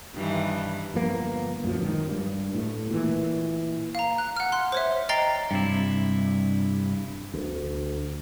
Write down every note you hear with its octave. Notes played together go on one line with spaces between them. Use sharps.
G2 D#3 E3
G1 F3 A#3 B3
F#2 A#2 F3 F#3
G#2 D#3
G2
A2 A3
A#2 E3
F5 A#5
F#6
F#5 F6
C6 F#6
C5 C#5 E5
D#5 G5 A#5 A6 C7 G7
G2 C3 E4
D2